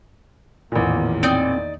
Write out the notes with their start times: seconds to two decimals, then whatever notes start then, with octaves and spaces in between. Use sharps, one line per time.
0.72 A1 E2 A#2 D#3 A#3
1.23 C4 D#4 D5 G6